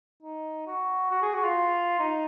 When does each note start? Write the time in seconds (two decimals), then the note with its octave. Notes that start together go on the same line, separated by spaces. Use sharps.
0.23 D#4
0.67 F#4
1.11 F#4
1.22 G#4
1.34 F#4
1.45 F4
2.00 D#4